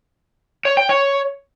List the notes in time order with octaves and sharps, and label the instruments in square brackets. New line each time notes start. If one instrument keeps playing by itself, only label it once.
[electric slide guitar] C#5
G5
C#5